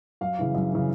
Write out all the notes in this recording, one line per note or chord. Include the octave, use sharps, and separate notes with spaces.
F#2 F5
C#3 E3
F#2
C#3 E3